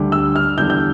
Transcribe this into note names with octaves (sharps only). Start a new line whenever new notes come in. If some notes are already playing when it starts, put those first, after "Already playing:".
Already playing: D2 D3 G3
E6
F6
E2 D3 G3 G6
G6